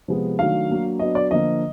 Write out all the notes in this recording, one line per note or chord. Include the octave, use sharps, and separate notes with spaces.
C3 F3 G#3 B3
D#3 F#3 A3 D4 F5
F#3 A#3 D4
F#3 B3 D4 D#5
D5
D3 F3 A#3 D#5